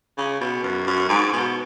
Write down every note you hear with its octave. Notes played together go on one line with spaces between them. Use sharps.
C#3
B2
F#2
F#2
G#2
B2